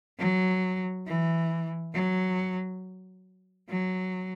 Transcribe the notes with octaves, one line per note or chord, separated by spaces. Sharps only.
F#3
E3
F#3
F#3